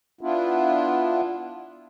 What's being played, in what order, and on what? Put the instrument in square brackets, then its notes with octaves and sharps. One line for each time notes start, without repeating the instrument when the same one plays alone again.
[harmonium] B3 D4 E4 F4